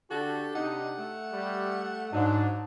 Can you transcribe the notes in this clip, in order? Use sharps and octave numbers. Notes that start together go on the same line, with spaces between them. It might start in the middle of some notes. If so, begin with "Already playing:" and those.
D3 D4 F#4 G4 A4
C3 D#4 F#5
A3
G3
G#2 F#3 D4 D#4